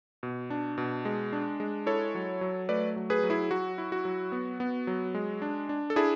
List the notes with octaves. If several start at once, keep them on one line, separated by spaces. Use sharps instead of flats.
B2
D4
B2
G#3
D4
G#3
E4 A4 C#5
F#3
F#3
A3 B4 D5
F#3
G#4 B4
F#3
E4 G#4
F#3 F#4
E4
F#4
F#3
B3
B3
F#3
G#3
D4
D4
A4
D4 E4 G#4